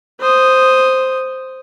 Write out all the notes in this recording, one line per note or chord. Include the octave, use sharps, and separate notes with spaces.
C5 D#6